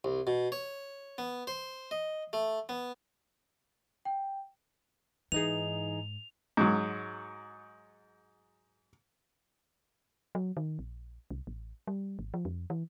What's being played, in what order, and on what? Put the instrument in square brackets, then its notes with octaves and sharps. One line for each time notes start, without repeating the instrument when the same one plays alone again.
[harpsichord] C2
B2
C#5
B3
C5
D#5
A3
B3
[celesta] G5
[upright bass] G#2 [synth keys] E3 D#4 G#4 [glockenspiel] F7
[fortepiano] G#2 F#3
[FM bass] F#3
D#3
A#1
C2
A1
G3
G#1
F3
F2
E3